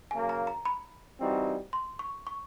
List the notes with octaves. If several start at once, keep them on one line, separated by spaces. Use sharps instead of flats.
C#3 F#3 A#3 G#5
A#5
A#5
B5
E3 G3 C4 D#4 F#4
C6
C#6
C#6